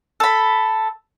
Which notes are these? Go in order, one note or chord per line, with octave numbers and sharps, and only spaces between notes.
A4 B5